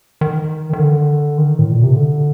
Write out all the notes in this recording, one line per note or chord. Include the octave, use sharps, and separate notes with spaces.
D#3
D#3
D3
D#3
A2
A#2
C3
D3